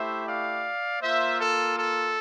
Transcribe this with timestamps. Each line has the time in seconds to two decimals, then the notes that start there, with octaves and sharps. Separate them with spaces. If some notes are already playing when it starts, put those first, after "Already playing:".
Already playing: A3 E4 G4 C5 E5
0.27 D5 F5
1.02 A#3 F4 C5 E5
1.40 A4
1.77 A4